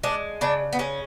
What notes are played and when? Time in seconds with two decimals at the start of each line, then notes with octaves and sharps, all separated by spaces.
0.03 G#3 D4
0.41 C#3 D4
0.73 B3
0.79 G#3 C#4